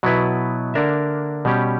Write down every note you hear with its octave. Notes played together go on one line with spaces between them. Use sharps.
B2 F#3 B3 E4 B4
D3 A#3 D4 A#4 E5
B2 G3 C#4 G4